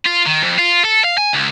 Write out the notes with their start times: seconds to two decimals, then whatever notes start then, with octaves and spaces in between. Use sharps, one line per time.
0.05 F4
0.26 D#3
0.42 F2
0.58 F4
0.84 A4
1.04 F5
1.18 G#5
1.33 C#2